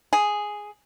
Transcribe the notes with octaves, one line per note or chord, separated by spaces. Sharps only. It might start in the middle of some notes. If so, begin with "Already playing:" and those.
G#4